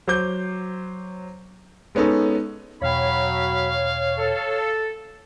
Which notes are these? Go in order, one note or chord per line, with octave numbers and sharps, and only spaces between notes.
F#3 C5 D6 G6
G#3 B3 C#4 D#4 A4
E2 B2 F#3 C#5 F5 G5 B5
A4